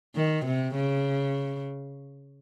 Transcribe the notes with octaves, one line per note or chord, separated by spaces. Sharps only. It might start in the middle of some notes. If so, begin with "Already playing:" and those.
D#3
C3
C#3